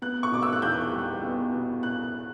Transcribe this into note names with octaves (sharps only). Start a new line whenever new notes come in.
B3 F#6
C#6
B2 D6
E6
F#6
E2 G6
G3
B3
B2
F#6